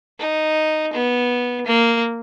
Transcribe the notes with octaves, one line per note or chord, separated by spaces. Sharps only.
D#4
B3
A#3